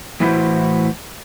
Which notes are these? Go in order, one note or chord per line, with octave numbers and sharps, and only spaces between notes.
A2 E3 E4 F#4 B4 C5